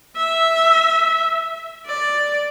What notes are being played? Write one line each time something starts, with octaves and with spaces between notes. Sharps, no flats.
E5
D5